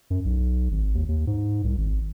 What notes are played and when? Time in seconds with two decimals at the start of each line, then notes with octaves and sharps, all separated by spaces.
0.10 F#2
0.25 B1
0.71 G#1
0.94 D#2
1.09 D#2
1.27 G#2
1.64 C2
1.78 G#1